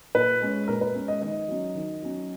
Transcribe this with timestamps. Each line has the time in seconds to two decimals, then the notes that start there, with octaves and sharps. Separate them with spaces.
0.15 A#2 B4
0.42 G#3 C#4
0.68 A#2 A#4
0.81 B4
0.95 G#3 C#4
1.08 D#5
1.22 D#3 D#5
1.48 F#3 C#4
1.75 D#3
2.03 F#3 C#4